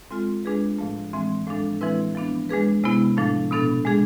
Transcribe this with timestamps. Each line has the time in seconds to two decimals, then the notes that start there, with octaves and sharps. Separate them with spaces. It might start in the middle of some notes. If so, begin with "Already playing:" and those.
0.11 G#3 C4 F4 A4
0.45 G#3 D4 G#4 B4
0.79 A2 F3 A3
1.13 E3 G#3 C4
1.47 A2 F3 G#3 D4 A4
1.81 E3 G#3 C4 E4 B4
2.15 F3 B3 D4
2.49 G#3 D4 G#4 B4
2.84 C3 G#3 B3 E4
3.17 A2 F3 A3 D4
3.51 B2 B3 D4 A4
3.85 G#3 D4 G#4